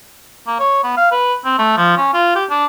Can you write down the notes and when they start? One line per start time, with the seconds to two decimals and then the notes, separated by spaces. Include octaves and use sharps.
0.47 A#3
0.60 C#5
0.84 B3
0.97 F5
1.12 B4
1.45 C4
1.59 A3
1.77 F3
1.97 C#4
2.14 F4
2.35 G4
2.50 D4